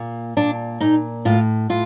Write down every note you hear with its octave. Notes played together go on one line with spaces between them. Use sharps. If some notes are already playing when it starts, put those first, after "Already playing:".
Already playing: A#2
A#2 D4
A#2 D#4
A2 F4
A2 F4